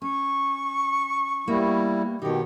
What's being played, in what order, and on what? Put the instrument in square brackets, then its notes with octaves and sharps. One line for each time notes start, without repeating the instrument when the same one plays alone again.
[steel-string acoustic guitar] C#4 [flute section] C#6
[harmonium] G3 E4 [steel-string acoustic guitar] A#3 B3
[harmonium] B2 D#3 G4 [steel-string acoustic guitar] D#4 C#5